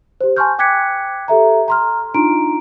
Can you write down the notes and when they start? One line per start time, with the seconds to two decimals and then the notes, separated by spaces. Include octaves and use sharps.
0.21 G4 C5
0.36 G#5 A5 C6 C#6 F6 G6
0.59 G5 D6 F#6 G#6 B6 C#7
1.28 G4 A4 E5 A#5
1.68 A#5 C6 F6
2.14 D4 D#4 F4 A#5 C6 D7